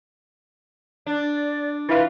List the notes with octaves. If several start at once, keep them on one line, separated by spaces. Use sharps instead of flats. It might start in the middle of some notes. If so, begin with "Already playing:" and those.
D4 D5
E3 F4 B4